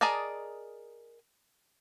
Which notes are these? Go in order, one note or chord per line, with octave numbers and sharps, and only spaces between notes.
G#4 A#4 D5 D#5 A5